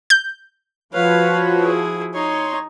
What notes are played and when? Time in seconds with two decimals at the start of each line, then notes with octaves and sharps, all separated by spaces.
0.10 G6
0.94 F3 F#4 B4 C#5 F5
1.60 E4 G#4
2.14 D#4 C#5 C6 C#6